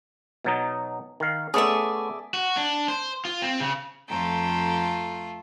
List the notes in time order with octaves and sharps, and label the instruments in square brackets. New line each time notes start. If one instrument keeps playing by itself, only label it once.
[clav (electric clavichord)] B2 F#3 D#4
D#3 F5
[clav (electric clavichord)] A3 B3 C#4 [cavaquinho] G#4 D5 E5
[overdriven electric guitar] F#4
D4
C5
F4
C4
C#3
[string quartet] F2 G5 A#5 [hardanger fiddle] A3 F4